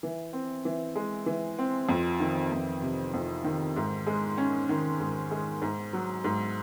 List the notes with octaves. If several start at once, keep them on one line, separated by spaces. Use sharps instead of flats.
E3
C4
E3
G#3
E3
C4
F2
D#3
F2
C3
F2
D#3
G#2
G#3
C#4
D#3
G#2
G#3
G#2
F#3
G#2